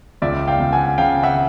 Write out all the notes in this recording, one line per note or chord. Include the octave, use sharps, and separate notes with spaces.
C#2 D5 E5
F5 G5
C#2
F#5 G#5
C#3 F5 G5
E5 F#5